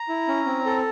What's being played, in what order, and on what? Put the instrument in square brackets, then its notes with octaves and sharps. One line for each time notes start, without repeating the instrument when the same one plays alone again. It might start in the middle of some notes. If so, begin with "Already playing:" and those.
Already playing: [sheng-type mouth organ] A#5
E4
C#4
C4
A4